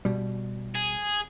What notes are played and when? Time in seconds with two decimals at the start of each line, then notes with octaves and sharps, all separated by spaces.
0.05 B2 G3
0.75 G#4